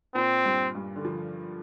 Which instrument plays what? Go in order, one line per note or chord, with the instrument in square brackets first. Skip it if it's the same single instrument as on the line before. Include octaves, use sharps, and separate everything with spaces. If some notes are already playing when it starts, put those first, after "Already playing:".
[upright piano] A#2 [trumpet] C4
[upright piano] G2
G2
D3
F3